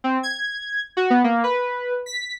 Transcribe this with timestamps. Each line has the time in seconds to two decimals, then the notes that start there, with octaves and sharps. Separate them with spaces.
0.04 C4
0.23 G#6
0.97 F#4
1.10 B3
1.24 A#3
1.44 B4
2.06 B6